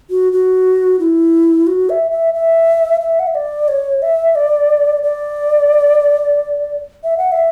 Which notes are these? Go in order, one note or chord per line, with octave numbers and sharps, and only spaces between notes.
F#4
F#4
E4
F#4
E5
E5
E5
E5
F#5
E5
D5
C#5
E5
D5
D5
E5
F#5
E5